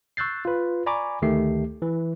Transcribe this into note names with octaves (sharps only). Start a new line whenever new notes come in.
C#6 E6 F#6 G6 A6 C7
F4 B4
D5 G#5 A#5 B5 C#6 D6
D2 D#3 A3 G4 C7
E3